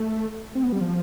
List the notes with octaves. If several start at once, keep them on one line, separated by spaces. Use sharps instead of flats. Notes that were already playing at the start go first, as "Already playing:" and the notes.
Already playing: A3
C4
B3
G3
F3